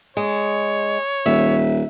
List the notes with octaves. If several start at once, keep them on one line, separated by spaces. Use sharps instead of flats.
G#3 C#5
D#1 E5